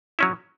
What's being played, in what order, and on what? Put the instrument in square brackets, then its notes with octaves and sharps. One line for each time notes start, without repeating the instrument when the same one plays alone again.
[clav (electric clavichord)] F#3 C#4 E4